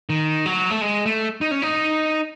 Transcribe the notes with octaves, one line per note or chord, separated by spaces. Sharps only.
D#3
F#3
A3
G#3
A3
D#4
C#4
D#4